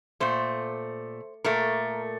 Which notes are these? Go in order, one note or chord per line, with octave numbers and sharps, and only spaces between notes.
A#2 A3 C5
A#2 A3 A#4